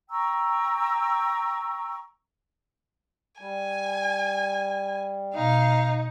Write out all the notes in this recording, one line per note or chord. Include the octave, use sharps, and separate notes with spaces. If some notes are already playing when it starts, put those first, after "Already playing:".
G5 A#5 C#6 E6
G3 G#5
B2 D#4 F5